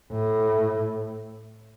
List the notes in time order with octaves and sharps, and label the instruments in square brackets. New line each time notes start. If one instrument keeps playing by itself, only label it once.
[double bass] A2